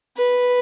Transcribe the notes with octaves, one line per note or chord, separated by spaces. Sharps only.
B4